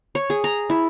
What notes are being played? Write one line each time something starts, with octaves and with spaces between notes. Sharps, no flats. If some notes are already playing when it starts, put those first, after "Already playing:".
C#5
G#4
A#5
E4